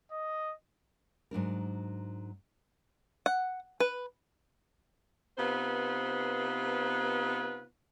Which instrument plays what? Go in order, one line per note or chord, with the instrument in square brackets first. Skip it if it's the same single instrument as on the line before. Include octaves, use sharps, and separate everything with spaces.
[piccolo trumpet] D#5
[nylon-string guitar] G#2 F#3 D4 A#4
[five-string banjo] F#5
B4
[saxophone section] C3 B3 D#4 F4 B4 C5